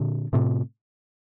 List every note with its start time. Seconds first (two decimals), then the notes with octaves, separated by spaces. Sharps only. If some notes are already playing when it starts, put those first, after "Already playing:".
Already playing: A#2 D3
0.33 A2 C3